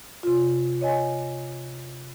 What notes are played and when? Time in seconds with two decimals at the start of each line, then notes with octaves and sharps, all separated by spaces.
0.23 C3 F4
0.81 C#5 D#5 G#5